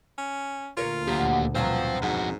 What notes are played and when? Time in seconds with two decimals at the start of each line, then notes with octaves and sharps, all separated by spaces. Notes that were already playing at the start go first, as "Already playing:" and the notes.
0.18 C#4
0.77 D2 A#2 F4 A#4 C#5
1.08 F#3 A#3 F#4 G4
1.55 G2 B2 F#3 C4 C5 F5
2.02 F2 G#2 F#4